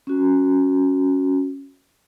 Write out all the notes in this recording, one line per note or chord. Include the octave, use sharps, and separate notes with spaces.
C#4 F#4